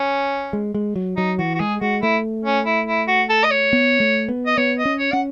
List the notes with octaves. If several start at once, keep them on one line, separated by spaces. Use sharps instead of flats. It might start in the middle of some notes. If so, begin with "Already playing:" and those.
Already playing: C#4
G#3
G#3
F#3
F#3 D#4
E3 F#4
F#4
G#3 G#4
G#3 F#4
A3 E4
C#4
E4
E4
F#4
A4
D#5
C#5
B3
A3
B3
D#5
B3 C#5
D#5
C#4
C#5
C#4 F#5